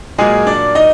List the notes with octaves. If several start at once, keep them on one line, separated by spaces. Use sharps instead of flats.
A#2 F#3 G#3 A#3 G#4
D4 D5
D#4 D#5